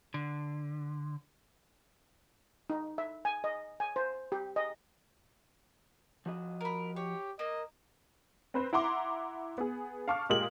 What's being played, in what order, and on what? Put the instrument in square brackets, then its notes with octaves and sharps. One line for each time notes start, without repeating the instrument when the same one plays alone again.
[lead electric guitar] D3
[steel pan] D#4
E5
G#5
D#5
G#5
C5
G4
D#5
[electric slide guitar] F3 F#4 D#5
[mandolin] A#4 B5
[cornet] G4 [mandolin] C#5
[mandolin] A#3 [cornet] D#5
[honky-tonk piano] C4 B4 C5
E4 F#5 A#5 C6 D6
B3 G#4
F5 A5 C#6 D6 F6
A#2 G#3 G4 A#4 D#6 F#7